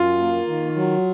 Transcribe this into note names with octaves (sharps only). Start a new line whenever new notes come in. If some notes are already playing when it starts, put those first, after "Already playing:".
Already playing: F#2 F4
A#3
D#3
F#3